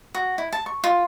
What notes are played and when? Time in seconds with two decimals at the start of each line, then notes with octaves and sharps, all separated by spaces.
0.15 F#4
0.38 E4
0.53 A5
0.66 C#6
0.84 F4